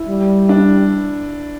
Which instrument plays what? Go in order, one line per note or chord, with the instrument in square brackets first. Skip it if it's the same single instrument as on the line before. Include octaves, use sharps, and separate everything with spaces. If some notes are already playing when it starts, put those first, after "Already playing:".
Already playing: [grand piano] E4
[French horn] G3
[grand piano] D4